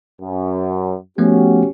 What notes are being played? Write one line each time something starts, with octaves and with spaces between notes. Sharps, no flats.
F#2
F3 A3 B3 C#4 F#4 G4